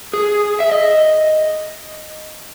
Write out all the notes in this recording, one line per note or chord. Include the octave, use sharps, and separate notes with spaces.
G#4
E5
D#5